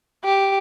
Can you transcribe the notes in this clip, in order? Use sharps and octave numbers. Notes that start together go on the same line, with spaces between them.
G4